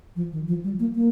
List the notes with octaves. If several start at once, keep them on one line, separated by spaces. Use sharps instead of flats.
F3
D#3
F3
G3
A#3
A#3